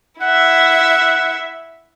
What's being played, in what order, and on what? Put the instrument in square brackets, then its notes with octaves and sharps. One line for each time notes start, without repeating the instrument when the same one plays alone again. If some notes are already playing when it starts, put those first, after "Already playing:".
[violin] E4 E5 [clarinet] F#5